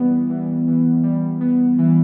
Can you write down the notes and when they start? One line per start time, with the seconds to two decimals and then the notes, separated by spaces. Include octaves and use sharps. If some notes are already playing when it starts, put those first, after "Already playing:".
Already playing: E3 G3 B3
0.30 E3
0.67 E3
1.04 G3
1.41 B3
1.78 E3